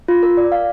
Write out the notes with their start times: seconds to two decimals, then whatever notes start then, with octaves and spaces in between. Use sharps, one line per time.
0.08 F4
0.23 A#4
0.37 D5
0.52 F5